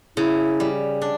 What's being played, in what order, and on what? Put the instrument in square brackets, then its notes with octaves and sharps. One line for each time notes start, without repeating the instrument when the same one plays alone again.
[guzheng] C#3 [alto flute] E4
[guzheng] G3
D4